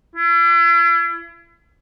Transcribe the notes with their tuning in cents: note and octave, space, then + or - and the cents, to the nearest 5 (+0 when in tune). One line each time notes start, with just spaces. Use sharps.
E4 +40